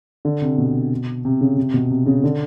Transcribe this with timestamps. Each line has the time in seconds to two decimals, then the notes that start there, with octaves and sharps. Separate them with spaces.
0.25 D3
0.42 C3
0.58 B2
1.25 C3
1.41 C#3
1.57 C3
1.74 B2
1.90 C3
2.06 C#3
2.24 D3